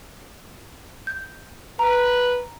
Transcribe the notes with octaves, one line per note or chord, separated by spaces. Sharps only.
G6
B4 A#5